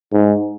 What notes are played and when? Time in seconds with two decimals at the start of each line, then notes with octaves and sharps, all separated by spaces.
0.12 G#2